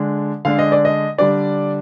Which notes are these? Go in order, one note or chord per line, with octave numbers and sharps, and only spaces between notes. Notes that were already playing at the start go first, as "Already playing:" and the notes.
Already playing: D3 G#3 D4
D3 G#3 D4 F5
D#5
D5
D#5
D3 G3 D4 D5